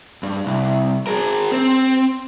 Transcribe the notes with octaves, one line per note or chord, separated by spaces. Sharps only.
G2
C2
G#4 A#4
C4